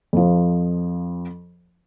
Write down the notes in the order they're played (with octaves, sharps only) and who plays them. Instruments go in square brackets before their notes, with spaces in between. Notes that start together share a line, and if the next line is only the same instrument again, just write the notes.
[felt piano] F2 F3